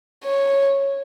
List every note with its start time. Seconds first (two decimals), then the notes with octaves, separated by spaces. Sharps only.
0.24 C#5